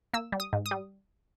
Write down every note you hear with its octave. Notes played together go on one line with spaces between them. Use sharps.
A#3 E6
G3
D#6
G#2
D#6
G3